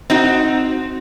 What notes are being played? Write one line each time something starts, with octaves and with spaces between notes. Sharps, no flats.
C4 D#4 F#4